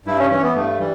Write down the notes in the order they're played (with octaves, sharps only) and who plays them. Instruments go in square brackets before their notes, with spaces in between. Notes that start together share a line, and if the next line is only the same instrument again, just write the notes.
[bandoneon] G2 E4
C#4
E3 C#4
B3
G2 A3
E3 G3